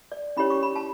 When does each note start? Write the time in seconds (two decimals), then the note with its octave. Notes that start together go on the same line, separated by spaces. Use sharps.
0.12 D5
0.37 C#4 E4 G4 C#5 B5
0.50 C#6
0.63 B5
0.76 A5